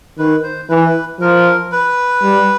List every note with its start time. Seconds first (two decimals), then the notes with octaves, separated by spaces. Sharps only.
0.18 D#3 B4
0.43 C5
0.69 E3 B4
1.20 F3 A#4
1.72 B4
2.23 G3